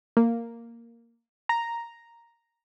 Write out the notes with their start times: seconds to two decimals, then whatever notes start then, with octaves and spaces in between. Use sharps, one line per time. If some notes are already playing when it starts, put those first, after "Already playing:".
0.17 A#3
1.49 A#5